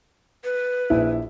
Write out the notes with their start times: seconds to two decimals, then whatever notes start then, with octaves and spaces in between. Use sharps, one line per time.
0.44 B4
0.90 A#1 E4